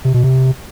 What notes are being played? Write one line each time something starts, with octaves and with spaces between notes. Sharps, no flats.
C3
B2
C3